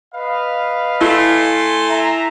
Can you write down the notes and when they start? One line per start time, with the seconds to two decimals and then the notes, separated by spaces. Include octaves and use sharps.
0.14 B4 D#5 F5
1.01 A3 E4 G#5 C6
1.88 E5 A#5